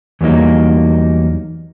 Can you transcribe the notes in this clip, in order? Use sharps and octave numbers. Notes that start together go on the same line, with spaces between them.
E2 F#3 G3 A#3 D#4